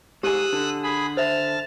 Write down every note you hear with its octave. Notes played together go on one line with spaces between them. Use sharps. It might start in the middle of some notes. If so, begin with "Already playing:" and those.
G#2 G4 G#4 D#6 E6 F#6 D#7
D3
G#4 B5
C5 E5 A5 F6